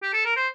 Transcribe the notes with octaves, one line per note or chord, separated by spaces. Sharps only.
G4
A4
A#4
C5